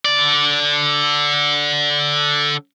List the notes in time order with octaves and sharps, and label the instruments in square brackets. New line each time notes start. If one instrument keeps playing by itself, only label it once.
[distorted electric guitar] D3 D5